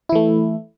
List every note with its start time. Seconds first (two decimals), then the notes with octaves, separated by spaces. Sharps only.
0.09 E4
0.12 E3
0.15 A3